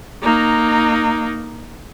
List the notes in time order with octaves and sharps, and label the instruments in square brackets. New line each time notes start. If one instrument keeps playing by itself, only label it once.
[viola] A#3 D#4